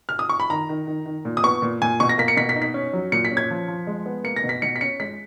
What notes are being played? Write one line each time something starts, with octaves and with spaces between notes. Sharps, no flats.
F6
D#6
C#6
B5
D#3 A#5
D#3
D#3
D#3
A#2
D#6
B3 C#6
A#2
A#2 G#5
B2 C#6
A#6
A#3 B6
C#7
B2 B6
B6
D#4
B6
C#4
F#3
A#2 C#7
B6
C#4
G#6
F3
F3
G#3
B3
A#3 C#7
A#6
B2
B6
B2 C#7
B6
C#4 C#7
G#3 B6